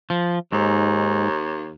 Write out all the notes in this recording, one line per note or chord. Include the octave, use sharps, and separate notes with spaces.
F3
D#2 G#2